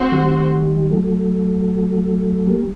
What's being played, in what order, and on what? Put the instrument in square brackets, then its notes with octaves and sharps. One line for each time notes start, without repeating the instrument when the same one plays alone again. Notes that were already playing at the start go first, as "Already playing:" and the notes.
Already playing: [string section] A3 C4 F#4 C5
[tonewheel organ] D#3 G3
F#3 A3
G3 A#3